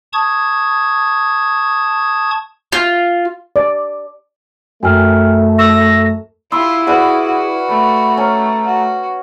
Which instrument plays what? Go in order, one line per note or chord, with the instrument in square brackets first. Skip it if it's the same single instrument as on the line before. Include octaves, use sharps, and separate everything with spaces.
[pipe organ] A5 C#6 D#6 G#6
[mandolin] F4
[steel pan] D5
[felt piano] F#2 [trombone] A3 [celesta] G5 G#5 F6
[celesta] C#6 E6 E7 [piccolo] A#6
[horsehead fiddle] E4 [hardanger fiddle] F4 G4 [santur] B5 C6 E6
[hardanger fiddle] F#4 [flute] G#4 [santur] B4 D5 F5
[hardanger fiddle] F#4
[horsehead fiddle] A3 [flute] B5
[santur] C#4 [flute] A#5
[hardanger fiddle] F#4